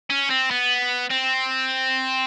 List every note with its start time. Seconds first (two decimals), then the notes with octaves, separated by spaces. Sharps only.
0.10 C#4
0.30 C4
0.51 B3
1.10 C4